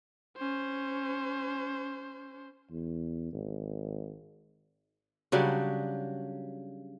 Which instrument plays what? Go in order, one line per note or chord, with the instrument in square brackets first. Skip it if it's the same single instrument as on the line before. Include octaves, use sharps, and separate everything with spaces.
[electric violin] C#4 C5
[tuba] E2
G#1
[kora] C#3 F#3 G3 D4